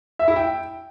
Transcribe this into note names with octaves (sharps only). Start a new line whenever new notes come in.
E5
E4
G5